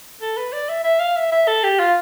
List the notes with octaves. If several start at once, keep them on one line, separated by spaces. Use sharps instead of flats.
A4
B4
D5
E5
E5
F5
E5
E5
A4
G4
F4